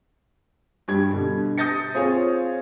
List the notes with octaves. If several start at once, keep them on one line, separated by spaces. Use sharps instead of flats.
G2 G3 G4 G#6
B2 D3
D#6 G6 A6 A#6 C#7
C4 F4 G#4 C#5